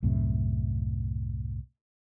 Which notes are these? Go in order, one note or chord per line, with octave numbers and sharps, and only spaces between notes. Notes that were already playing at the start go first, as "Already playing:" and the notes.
C2 F#2 A2 C3